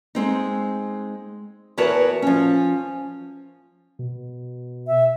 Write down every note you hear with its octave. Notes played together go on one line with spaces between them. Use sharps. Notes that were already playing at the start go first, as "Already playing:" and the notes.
G#3 C4 D#4
E2 F#4 A#4 B4 C#5 A5
F3 C#4
B2
E5